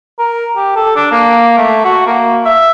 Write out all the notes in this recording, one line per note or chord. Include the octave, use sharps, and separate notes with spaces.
A#4
G4
A4
D4
A#3
A3
F#4
A#3
E5